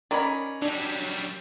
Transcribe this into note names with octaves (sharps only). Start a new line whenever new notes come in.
D#3 C#4 D5 A#5 B5
F#3 G3 D4